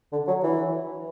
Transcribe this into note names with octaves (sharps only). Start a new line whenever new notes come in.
D3
F#3
E3